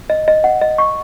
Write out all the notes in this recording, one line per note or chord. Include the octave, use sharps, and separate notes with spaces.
D#5
D#5
F#5
D#5
C#6